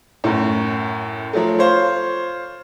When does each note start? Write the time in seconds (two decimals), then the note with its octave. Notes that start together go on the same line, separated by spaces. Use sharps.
0.24 F#2 A2
1.33 F3 F#3 A3
1.59 F4 C5 C#5